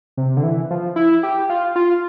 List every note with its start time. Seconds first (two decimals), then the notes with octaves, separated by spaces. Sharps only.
0.17 C3
0.37 D3
0.43 E3
0.71 F3
0.96 E4
1.23 G4
1.50 F4
1.76 F4